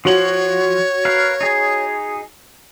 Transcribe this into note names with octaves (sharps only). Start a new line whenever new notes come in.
F3 F#4 C#5 F#7
A#4 B4 F5
D#4 G#4